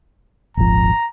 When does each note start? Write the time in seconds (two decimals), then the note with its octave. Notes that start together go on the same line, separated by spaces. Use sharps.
0.57 D#1 G#1 F3 A#5